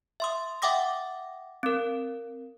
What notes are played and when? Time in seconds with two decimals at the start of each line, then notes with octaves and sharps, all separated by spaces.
0.20 E5 C6 D#6
0.62 E5 F#5 G5 D6 D#6 A#6
1.63 C4 A#4